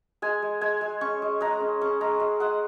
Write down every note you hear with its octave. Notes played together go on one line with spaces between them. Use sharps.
G#3 G#5
G#3
G#3 G#5
G#3
C#4 C#6
G#3
G#3 A#5
C#4
C#4 C#6
G#3 A#5
G#3
G#3 F#5